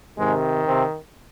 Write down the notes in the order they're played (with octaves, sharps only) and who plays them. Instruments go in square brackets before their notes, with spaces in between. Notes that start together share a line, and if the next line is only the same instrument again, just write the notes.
[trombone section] G#2 C3 D#3 G#3
C3 C4